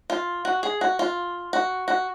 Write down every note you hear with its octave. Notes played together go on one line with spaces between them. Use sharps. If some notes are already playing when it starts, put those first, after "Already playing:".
F4
F#4
G#4
F#4
F4
F#4
F#4